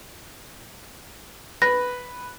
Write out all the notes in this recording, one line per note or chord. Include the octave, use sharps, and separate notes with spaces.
B4 A#6